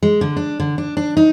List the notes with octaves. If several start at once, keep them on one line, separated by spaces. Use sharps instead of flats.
G#3
D3
D4
D3
D4
D4
D#4